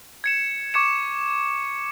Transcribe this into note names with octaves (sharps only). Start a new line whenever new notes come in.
G#6 C#7 E7
C#6 D6 G#6 C#7 E7